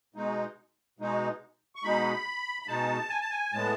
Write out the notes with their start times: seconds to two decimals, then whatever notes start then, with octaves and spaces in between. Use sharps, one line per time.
0.14 B2 G#3 D#4
0.99 B2 G#3 D#4
1.76 C#6
1.83 B2 G#3 D#4 B5
2.62 B5
2.68 B2 G#3 D#4 A5
3.10 G#5
3.20 A5
3.30 G#5
3.52 A2 G#3 B3 A5